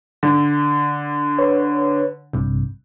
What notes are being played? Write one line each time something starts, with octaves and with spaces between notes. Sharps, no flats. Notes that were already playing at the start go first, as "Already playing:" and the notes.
D3
B4 C#5
A#1 G2 C3